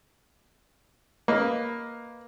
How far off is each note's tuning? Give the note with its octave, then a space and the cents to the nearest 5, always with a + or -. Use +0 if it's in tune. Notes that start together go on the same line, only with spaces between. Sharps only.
A#3 +5 B4 +0 D#5 +0